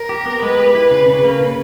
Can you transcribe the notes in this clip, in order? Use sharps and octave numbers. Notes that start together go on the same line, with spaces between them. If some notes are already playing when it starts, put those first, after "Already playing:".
Already playing: A#4
G4
B3
G#3 B4
G4
E4
C#3
C#3
A#3
C#3